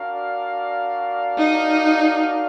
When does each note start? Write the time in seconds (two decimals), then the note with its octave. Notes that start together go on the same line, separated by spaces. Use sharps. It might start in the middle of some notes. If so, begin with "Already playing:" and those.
Already playing: D4 F#4 A#4 D5 F5
1.38 D#4